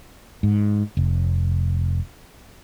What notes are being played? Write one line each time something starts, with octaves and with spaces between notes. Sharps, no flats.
G#2
F1